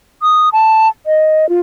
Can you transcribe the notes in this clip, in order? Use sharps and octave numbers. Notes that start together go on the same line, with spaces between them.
D#6
A5
D#5
F4